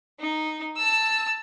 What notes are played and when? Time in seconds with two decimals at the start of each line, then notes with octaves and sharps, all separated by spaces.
0.20 D#4
0.77 A5 E6